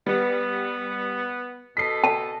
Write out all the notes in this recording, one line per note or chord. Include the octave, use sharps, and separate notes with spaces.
G3 B3
B2 A4 D#5 B6 C7
A5